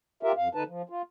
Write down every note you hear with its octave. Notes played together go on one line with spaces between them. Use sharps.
F4 G4 A#4 E5
F2 F5
D3 D#4 B4 A5
F3
F4